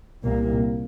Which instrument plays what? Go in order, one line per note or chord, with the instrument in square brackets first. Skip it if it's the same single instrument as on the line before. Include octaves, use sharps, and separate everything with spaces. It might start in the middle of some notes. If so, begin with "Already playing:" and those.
[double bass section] C2 A#2 A#3